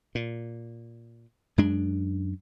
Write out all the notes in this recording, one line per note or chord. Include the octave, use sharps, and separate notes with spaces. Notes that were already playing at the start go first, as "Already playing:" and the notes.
A#2
F#2 G#3 D4